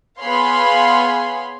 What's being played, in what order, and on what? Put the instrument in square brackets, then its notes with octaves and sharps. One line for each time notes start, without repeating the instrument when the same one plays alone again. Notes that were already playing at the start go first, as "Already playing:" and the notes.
[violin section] B3 G#4 C#5 F5 B5 C6